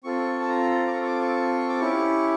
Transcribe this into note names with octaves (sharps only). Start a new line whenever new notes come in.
C4 F4 A4 C#6
A5
A#5
D6
C#6
C#6
D6
C#6
D6
C#4 E4 G4 C#6